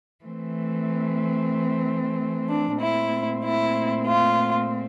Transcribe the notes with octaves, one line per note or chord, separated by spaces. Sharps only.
E3 A3 C4
D4
A#2 A3 C4 E4
E4
F4